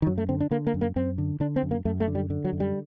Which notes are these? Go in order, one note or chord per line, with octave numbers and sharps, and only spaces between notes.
D#3
F#2 F#3
A3
D3 C4
D4
D3 A#3
A#3
F#2
A#3
F#2 C4
D3
D3 D4
C4
F#2
A#3
F#2 A3
A3
D3
G3
D3
F#3
F#2
G3